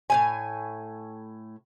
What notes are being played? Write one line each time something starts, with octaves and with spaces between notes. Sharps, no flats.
A2 C3 G#5